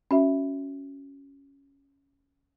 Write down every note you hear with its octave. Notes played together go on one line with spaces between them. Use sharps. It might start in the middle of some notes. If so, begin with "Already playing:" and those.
C#4 F#4 E5